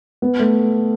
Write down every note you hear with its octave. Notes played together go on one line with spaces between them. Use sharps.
B3
A3